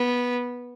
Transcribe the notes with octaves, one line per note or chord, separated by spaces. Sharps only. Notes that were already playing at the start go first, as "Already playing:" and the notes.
Already playing: B3